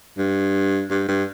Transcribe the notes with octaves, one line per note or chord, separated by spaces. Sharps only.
G2
G2
G2